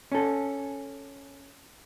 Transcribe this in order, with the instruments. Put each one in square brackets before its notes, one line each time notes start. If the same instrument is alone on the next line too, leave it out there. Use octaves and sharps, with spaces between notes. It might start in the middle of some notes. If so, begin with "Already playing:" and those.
[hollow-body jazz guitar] C#4 A4